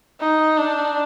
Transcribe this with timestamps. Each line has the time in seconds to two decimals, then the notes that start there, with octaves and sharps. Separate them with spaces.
0.20 D#4
0.58 D4